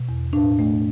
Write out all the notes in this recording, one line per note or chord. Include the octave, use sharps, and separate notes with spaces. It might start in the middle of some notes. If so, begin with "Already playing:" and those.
Already playing: B2
E2
A2 D4
A3